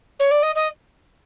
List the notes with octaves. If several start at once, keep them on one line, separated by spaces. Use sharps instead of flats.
C#5
D5
D#5
D#5